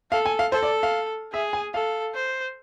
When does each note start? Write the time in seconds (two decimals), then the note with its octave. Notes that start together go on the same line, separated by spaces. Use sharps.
0.12 A4 F5
0.26 G#5
0.39 F5
0.52 A4 C5
0.63 D5
0.83 F5
1.33 G#4 E5
1.53 G#5
1.74 A4 F5
2.15 C5